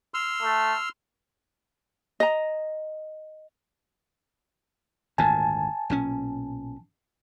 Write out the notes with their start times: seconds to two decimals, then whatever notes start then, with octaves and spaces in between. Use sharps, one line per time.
0.14 C6 E6 F6
0.43 A3
2.20 D#5 A#5
5.18 G#1 D2 A#2 G#5 A5
5.90 B1 A#2 C#4